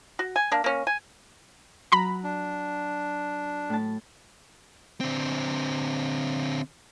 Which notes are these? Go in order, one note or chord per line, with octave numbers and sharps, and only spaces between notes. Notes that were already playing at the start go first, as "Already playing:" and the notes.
F#4
G#5
A#3 D4
A#3 C#4
G#5
F#3 A#5 B5
D4
A2 A5
D3 C4